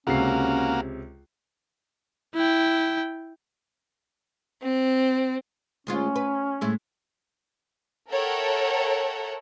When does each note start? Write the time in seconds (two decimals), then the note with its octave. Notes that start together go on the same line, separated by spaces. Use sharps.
0.07 C#2 C3 A#3 C#4 F#4 F5 C7
2.35 E4 G5
4.63 C4
5.87 D2 G#3 C#4 F4
6.16 B4
6.61 A2 G#3 A3
8.11 A4 A#4 C#5 E5 F#5 G5